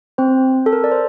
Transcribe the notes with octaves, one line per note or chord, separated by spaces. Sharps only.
C4 C5
A4
A#4
D5
C5